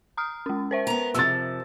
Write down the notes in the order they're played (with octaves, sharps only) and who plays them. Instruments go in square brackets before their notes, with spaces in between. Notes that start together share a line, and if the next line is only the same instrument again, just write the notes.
[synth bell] A#5 D#6 F6
G#3 C#4
A#4 C5 E5
[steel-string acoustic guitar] B3 A#5
[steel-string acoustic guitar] F2 C3 F3 [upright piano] E6 A6